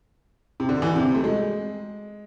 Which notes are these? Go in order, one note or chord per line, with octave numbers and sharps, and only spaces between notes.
C3
D3
E3
C3
A3
G#3